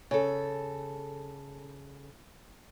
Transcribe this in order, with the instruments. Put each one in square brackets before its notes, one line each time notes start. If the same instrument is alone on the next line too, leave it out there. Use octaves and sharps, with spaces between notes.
[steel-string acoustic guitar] C#3 A4